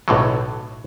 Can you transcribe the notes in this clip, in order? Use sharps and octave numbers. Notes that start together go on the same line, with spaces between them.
B1 A2 D3 F#3